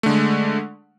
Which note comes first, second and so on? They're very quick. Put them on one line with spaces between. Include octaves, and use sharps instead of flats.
A3 D3 G#3